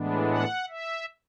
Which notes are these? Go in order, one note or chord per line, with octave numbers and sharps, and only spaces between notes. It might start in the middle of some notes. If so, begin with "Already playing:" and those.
Already playing: A2 E3 G#3 B3 D4
F#5
E5